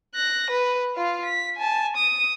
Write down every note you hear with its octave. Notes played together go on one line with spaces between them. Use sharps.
F#6 A#6
B4
F4 F5
B6
G#5 A5
D#6